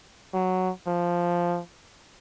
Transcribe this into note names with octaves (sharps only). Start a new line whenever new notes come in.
F#3
F3